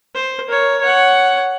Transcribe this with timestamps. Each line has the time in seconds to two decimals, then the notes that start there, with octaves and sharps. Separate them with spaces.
0.15 C5
0.48 A#4 C#5
0.81 C#5 F#5